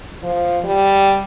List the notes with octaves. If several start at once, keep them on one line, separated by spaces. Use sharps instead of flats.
F3
G3